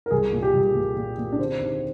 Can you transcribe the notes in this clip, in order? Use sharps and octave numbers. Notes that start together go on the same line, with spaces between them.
A#4
C2 G#4
A#2
G4
C2
A#2
A#2
A#2
D4
D3 C4
D#2